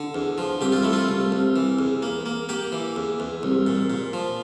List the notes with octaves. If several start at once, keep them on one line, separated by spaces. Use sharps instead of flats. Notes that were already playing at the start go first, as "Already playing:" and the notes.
Already playing: D3
E2
F3
C2 G4
F4
A3 E4
F4
C2
C2
E3
E2
A#3
A#3
A#3 G4
E3
E2
E2
C2
A#2
A#2
F3